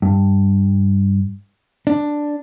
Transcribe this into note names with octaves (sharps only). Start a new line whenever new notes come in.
G2
D4